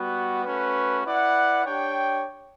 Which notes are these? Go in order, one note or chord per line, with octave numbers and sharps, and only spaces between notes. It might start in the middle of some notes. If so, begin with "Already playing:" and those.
Already playing: G3 B3 F#4
A3 C#4 F#4 B4
E4 B4 D5 F#5
D4 G4 C#5 G5